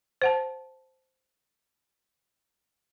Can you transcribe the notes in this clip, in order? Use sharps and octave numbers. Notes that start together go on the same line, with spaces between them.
C5 F#5 A5